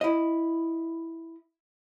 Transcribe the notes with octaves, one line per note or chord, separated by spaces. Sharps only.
E4 D#5